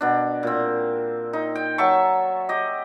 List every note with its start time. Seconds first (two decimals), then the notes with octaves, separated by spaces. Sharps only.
0.01 B2 D4
0.43 A#2 C4
1.33 D#4
1.55 G5
1.78 F#3 E5 A5 C#6
2.49 G4 D#5